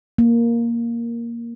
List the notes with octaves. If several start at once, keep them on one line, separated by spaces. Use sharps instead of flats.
A#3